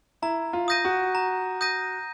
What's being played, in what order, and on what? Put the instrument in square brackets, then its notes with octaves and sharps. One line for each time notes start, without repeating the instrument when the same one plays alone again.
[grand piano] E4 [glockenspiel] A#5
[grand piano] F4
[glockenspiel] D#6 G6 A#6 D#7
[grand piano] F#4
[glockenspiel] A#5
D#6 G6 A#6 D#7